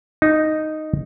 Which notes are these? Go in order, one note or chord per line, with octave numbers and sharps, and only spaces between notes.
D#4